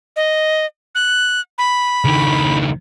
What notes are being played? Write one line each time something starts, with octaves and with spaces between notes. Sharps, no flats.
D#5
F#6
B5
C#2 D#3